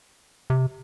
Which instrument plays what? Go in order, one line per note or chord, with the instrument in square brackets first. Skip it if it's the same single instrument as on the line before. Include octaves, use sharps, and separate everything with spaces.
[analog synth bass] C3